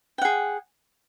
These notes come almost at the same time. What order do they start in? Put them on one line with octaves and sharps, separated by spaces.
G5 F#5 G#4